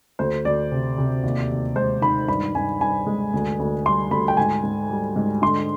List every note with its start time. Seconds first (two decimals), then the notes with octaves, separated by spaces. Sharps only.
0.19 D2 C5
0.45 D2 D5
0.72 C3
0.98 C3
1.23 D#2
1.50 D#2
1.76 G#3 C5
2.02 D#3 B5
2.28 G2 B5
2.55 G2 G#5
2.81 G2 G#5
3.07 G#3
3.34 D2
3.59 D2
3.86 G3 C6
4.11 D2 B5
4.28 G5
4.37 G#2 G#5
4.63 G#2
4.90 G3
5.16 G#2
5.42 D3 C6